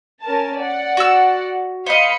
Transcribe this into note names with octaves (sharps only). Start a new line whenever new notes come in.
C#4 A#4 A5
D5 F#5
F#4 E6
C5 D#5 F5 B5 C#7